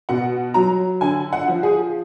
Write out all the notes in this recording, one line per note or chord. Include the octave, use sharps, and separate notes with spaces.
B2 F#5
F#3 A#5
D3 G#5
F#5
F3
G#4